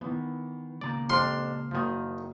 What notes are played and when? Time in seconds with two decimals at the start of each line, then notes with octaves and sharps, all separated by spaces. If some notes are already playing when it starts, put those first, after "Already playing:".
0.01 D#3 E3 B3
0.81 C#2 A#2 D5 A#5
1.10 F2 D4 G4 C5 C6 F6
1.71 F#1 D#3 F3 F#4 D#6